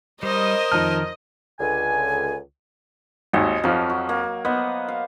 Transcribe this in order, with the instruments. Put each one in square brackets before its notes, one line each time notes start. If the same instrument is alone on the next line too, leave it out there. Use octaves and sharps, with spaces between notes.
[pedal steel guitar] G3 [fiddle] A#4 C5 [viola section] D#5
[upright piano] F2 D#4 A5 [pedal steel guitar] D#3 F6
[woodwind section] C#2 D3 G#5
[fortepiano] G#1 D#2 [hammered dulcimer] D#5
[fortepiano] F2 F3 [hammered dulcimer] F#3
[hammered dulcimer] F#4
A#3
[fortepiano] B3 [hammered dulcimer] C5 D#5 F#5
[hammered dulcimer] F5